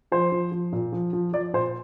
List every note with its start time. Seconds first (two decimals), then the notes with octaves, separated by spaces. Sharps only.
0.12 F3 C5
0.32 F3
0.52 F3
0.73 A#2
0.93 F3
1.13 F3
1.33 F3 D5
1.53 A#2 C5